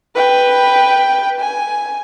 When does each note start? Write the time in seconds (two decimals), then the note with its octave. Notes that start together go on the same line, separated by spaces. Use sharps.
0.15 B4 G5
1.40 G#5